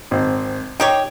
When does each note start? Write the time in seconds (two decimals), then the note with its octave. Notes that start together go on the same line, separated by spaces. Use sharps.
0.11 G#1 C4
0.80 D#4 G4 C#5 G5